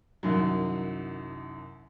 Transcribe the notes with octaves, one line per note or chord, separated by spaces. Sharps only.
C2 F#2 D#3 F#3